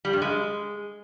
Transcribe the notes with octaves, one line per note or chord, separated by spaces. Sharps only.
G3
G2
G#3